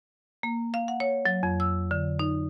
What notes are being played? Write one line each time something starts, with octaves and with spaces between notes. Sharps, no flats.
A#3
F5
F#5
C#5
F#3
F2
E6
D3
D#4